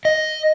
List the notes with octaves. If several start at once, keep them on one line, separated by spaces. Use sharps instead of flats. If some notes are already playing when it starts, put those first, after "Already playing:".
D#5